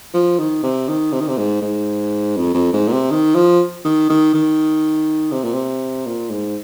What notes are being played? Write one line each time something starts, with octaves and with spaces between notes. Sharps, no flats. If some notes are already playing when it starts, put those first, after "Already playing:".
F3
D#3
C3
D#3
C3
D#3
C3
G#2
G#2
F2
F2
G#2
A#2
C3
D#3
F3
D#3
D#3
D#3
C3
A#2
C3
A#2
G#2